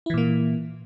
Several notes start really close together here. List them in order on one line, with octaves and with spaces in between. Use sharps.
E4 E3 A#2 A#3